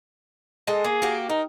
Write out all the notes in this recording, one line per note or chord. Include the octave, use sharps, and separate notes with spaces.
G#3 A4 D#5
A#3 G#4
A#3 F#4 G4
D#4 A#4